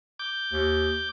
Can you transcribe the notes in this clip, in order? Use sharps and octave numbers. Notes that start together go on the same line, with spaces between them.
D6 G6
D#2